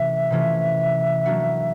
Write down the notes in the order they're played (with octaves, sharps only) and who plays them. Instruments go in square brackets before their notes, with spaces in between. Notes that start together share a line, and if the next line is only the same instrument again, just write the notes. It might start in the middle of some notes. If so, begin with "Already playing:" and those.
Already playing: [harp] C3 E3 A3 C#4 [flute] E5
[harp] C3 E3 A3 C#4 F4
F#3 A#3 D4 F#4